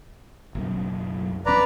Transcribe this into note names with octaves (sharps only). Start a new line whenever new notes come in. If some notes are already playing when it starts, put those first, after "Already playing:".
F#1 B1 F#2
D#1 C#4 B4 D5 A#5